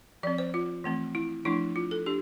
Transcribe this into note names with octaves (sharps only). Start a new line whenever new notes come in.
F3 C4 D5
C5
F4
E3 A3 C4
E4
F3 A3 D4 E4
F4
A4
D4 G4